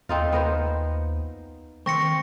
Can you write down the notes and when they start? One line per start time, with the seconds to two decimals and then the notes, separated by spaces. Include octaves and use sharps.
0.09 D#2 C4 D#4 F4
0.32 B3 A#4 C5
1.86 D#3 C4 C#6 A#6 C#7